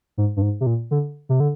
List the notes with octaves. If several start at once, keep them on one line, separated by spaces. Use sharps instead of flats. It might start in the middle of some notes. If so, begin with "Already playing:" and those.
G#2
G2
G#2
C3
A#2
D3
C3
D3